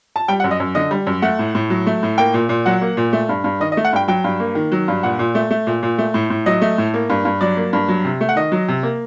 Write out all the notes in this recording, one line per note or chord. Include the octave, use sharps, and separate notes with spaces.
A5
G3 G5
F#5
F#2
D#5
F#2
D3 D#5
G3
F#2
A3 F#5
A2
A2
F#3
A3
A2
A#3 G5
A#2
A#2
F#3 F#5
A#3
A#2
A3
G2
G2
D#3 D#5
D#5
A3
F#5
G2 G5
F#3 G5
G2
A#3
D#3
F#3
G2
A#2 F#5
A#2
A3
A3
A#2
A#2
A3
A2
A2
F#3 D#5
A3
A2
A#3
G2
G2
F#3 D5
A#3
G2
F#3
C3
A3
F#5
D#3 D#5
F#3
C3
A#3